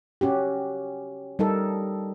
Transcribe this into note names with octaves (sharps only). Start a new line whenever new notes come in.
C#4 F#4 G4
G3 D#4 A4 A#4